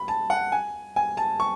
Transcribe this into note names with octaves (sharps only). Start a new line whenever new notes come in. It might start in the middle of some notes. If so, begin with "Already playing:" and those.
Already playing: B5
A5
F#5
G#5
G#5
A5
C#6